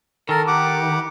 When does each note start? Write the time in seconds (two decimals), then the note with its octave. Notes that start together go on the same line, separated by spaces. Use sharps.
0.29 D#3 A4 A#4
0.47 G4 F#5 D6